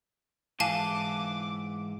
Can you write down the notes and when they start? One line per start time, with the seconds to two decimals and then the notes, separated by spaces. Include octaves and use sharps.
0.60 G#2 E3 F5 G#5 A5 D6